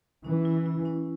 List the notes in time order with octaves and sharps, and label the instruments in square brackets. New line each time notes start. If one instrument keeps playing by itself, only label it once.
[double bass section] E3 [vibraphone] C#4
[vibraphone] E4
E4
C#4